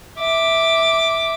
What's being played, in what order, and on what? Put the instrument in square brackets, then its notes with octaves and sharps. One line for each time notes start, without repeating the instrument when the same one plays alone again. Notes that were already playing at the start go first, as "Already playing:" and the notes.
[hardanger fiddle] E5 D6